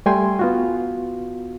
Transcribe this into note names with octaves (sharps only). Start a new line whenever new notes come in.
G3 A3 G5 G#5 C6
B3 F4 F#4